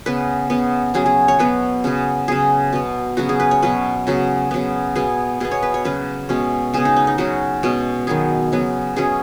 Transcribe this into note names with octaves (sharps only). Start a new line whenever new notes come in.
C#3 B3 B4
C#3 B3
C#3 F#3 C#4 G#4
G#4
C#5
B2 F#3 B3 B4
C#3 F#3 B3
C#3 F#3 B3 G#4
B2 B3
C#3 F#3 B3 F#4
G#4
B4
C#5
B2 F#3 C#4 B4
C#3 F#3 B3
C#3 F#3 B3
B2 B3 G#4
B2 B3 G#4
C#5
B4
C#5
C#3 F#3 C#4 B4
B2 G#3 C#4
C#3 B3 G#4
D#4
D#4
D#4
C#3 F#3 C#4 F#4
B2 G#3 C#4
D#3 F#3 B3 G#4
C#3 F#3 B3
B2 F#3 C#4 G#4